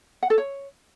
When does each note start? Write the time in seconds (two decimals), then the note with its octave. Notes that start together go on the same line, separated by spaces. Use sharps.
0.23 F#5
0.30 A4
0.38 C#5